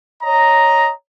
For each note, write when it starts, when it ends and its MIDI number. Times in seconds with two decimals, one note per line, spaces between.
0.24 0.91 73
0.24 0.91 75
0.24 0.91 82